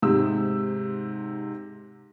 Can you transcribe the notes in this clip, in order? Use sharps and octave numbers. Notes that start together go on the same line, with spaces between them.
G#2 C3 E6